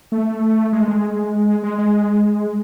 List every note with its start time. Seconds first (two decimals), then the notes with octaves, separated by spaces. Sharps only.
0.12 A3
0.73 G#3
0.88 G#3
1.63 G#3
1.78 G#3